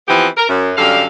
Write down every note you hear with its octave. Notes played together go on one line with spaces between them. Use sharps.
E3 F3 B3 C4 G4 B4
A#4
F#2
F#2 D3 G3 A4 F5